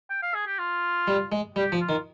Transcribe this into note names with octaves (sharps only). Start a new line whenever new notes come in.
G5
F5
G#4
G4
F4
G3
G#3
G3 G4
F3
F4
D#3